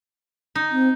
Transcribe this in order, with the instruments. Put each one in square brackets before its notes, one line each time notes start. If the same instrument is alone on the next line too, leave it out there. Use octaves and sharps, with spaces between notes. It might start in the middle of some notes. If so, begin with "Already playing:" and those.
[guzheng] D#4
[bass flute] C4